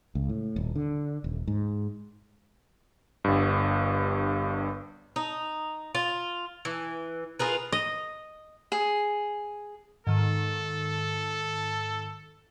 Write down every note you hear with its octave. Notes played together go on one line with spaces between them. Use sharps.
C#2
A2
D#1
D3
D#1
G#2
G1 G2
D#4
F4
E3
F4 G#4 A#4 B4
D#5
G#4
G#2 D#3 A4